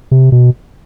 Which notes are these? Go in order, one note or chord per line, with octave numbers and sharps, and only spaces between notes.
C3
B2